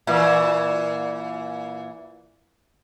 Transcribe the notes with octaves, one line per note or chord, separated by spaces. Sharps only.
A#2 E3